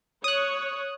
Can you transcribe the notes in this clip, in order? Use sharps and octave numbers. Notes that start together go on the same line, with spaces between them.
C#5 D#6 F#6